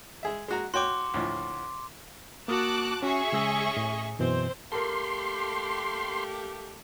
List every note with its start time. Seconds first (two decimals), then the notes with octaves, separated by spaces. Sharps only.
0.23 G#3 G#4 E5
0.48 G#3 F#4 A#5
0.74 F#4 C#5 G5 C6 D6
1.14 D2 A2 F3
2.48 A#3 F#4 A5 D6 D#6 F#6
3.03 C#4 F#4 G#4 E5 C#6
3.32 C#3 G#3 C#4 D#5 E6
3.77 A2
4.19 F#2 B2 E3 C4 C5
4.72 A3 A#3 G4 A4 A#4 C6